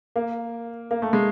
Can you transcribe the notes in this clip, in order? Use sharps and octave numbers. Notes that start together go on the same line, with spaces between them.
A#3
A#3
A3
G#3